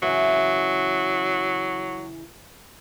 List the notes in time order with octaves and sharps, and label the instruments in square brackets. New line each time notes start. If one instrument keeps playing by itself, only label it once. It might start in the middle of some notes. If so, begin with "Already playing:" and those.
[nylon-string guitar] C#3 E3 [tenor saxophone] F#3